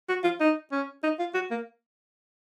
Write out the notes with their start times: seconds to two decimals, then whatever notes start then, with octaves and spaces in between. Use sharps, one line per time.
0.09 F#4
0.24 F4
0.40 D#4
0.72 C#4
1.04 D#4
1.19 F4
1.34 F#4
1.51 A#3